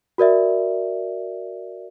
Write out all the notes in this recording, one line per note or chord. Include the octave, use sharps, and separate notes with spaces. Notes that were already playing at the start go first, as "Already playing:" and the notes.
F#4 A#4 D5 E5